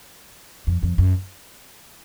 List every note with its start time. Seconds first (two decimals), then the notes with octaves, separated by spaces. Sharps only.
0.67 F2
0.83 F2
0.98 F#2